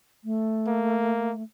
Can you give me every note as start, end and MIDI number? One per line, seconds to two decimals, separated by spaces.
0.24 1.43 57
0.67 1.31 58